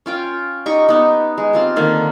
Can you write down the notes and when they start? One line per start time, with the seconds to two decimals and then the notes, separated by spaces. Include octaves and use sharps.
0.06 C#4 F4 G5
0.66 D#4 G4 D#5 C#6
0.89 B3 D#4
1.38 G#3
1.53 C4 F4 G4
1.76 D3 D#3 A#3